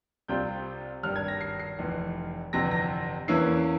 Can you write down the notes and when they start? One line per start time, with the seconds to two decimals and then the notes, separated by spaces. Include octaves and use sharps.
0.28 C2 C3 G3 C4 F4 G6
1.03 G#1 G2 G3 F6
1.16 G#6
1.28 A#6
1.41 C7
1.60 C7
1.78 F1 F2 E3
2.53 G1 F2 C3 E3 A#6
2.71 A#6
3.28 E2 E3 A#3 C#4 E4 C7